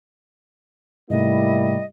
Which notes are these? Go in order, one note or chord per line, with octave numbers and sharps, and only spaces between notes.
G#2 C3 G3 A3 A#3 E4 D#5